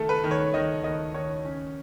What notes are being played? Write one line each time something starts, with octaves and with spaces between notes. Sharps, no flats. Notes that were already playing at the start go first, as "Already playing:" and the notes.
Already playing: D#3 A3 A4
B4
D#3
C#5
D#3 D#5
D#3 D#5
D#3 C#5
C#4